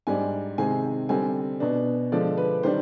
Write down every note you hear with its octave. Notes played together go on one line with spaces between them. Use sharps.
G#2 G3 D4 G#5
C3 D#3 G#3 C4 G#5
D3 G3 C4 G#5
B2 B3 D4
D3 F3 G#3 D5
B4
D#3 G3 D4 C5